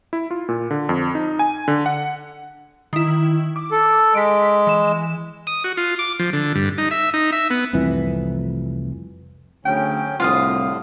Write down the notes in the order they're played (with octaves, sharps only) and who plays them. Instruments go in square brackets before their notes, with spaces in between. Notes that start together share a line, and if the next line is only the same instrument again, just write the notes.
[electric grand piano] E4
F4
A#2
D3
F2
D#4
G#5
D3
F#5
[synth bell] D#3 E4
D6
[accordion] A4
[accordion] G#3 [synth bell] B6 D7
[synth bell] E3 E7
[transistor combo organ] D#6
F#4
F4
D6
F3
D3
G2
D#4
E5
D#4
E5
B3
[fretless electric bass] F1 C2 F2 E3
[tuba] D2 [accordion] C#3 F#3 C#4 [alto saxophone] G5
[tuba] C2 [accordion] A2 D3 [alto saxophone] F3 [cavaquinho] F4 F5 D#6